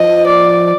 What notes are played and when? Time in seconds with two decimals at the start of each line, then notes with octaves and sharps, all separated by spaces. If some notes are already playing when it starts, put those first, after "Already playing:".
Already playing: F3 D#5
0.27 D5